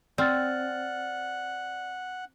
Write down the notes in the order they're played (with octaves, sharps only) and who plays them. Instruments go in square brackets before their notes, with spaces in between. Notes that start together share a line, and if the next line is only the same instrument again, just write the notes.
[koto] C4 [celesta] D5 F6 A6 [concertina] F#5